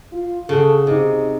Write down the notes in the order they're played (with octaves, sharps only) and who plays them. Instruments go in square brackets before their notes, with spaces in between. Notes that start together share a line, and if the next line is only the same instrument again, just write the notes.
[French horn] F4
[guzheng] C#3 F#4 [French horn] A4
[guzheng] C3 [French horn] D#4